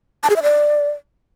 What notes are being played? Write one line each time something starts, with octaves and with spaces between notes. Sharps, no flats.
A5
G#4
E5
D5